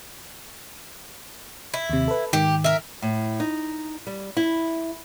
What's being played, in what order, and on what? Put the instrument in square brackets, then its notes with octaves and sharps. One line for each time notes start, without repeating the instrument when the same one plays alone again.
[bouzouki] E4
[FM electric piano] D#2 C3
A4 B4
[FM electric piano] G#2 D#3 [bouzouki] G4
[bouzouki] A#4 E5
[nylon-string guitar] A2
D#4
G3
E4